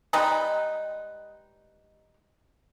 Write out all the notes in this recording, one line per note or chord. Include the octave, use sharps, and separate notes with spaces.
G3 G#3 D#4 B4